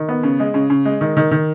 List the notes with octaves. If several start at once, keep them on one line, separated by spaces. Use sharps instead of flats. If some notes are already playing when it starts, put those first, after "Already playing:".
Already playing: D#3
B3
C#3
G#3
C#3
C#3
G#3
D#3
D#3
D#3